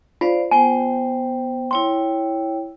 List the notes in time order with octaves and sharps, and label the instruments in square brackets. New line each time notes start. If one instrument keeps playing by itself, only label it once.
[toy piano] F4 [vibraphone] C5 D5 F5
[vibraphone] B3 C5 G5 [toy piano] G#5
[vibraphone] E4 C#5 G5 [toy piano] C6